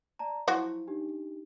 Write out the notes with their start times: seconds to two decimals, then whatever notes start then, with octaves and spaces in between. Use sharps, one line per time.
0.19 D5 A5 A#5
0.48 F3 F#3 E4 F#4
0.87 D4 D#4 G4